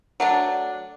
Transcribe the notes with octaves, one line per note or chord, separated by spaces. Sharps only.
F#3 A3 D4